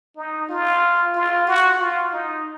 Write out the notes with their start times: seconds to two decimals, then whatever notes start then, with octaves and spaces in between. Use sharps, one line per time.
0.17 D#4
0.49 F4
1.15 F4
1.47 F#4
1.80 F4
2.13 D#4